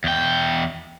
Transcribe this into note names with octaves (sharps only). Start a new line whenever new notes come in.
E2 G5